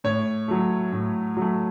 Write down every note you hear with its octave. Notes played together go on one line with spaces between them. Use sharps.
A2 C#5
F#3 A3
A2
F#3 A3